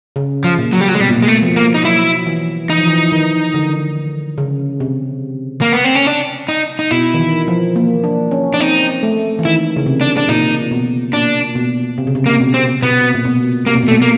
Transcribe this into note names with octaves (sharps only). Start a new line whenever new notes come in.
C#3
F3
A#2
F#3
G3
F#3
G#3
B2 G3
A#2
B2 G#3
A3
F3
A#3
D#4
F#3 E4
E3
E3 D#4
F3
E3
D#3
D3
C#3
C3
A#3
B3
C4
C#4
D4
D#4
D#4
B2 E4
D#3
E3
F3
A#3
D4
C#4
D4
C4 D#4
A3
E3
D#3 E4
C#3
C3
D4
D4
A#2 D#4
B2
A#2 D4
B2
C3
C#3
C3
A#3
C3
B2
C4
B2 B3
A#2
B2
C3 A#3
B2
A#2
A3
B2
A#3